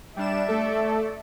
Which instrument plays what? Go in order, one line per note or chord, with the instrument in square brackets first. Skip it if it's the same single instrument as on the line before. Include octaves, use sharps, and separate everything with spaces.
[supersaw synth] G3 D4 E7 [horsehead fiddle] D5 E5
[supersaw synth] A3 A4